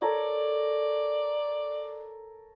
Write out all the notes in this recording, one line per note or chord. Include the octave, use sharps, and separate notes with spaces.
A4 A#4 C#5 D5